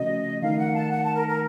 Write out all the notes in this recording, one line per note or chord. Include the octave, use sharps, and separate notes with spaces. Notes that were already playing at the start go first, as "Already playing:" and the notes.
Already playing: C#3 F3 A3 C#4 F#4 D#5
D#3 A3 D#4 A#4 F5
F#5
A5
F#5
A5
A#4
A#4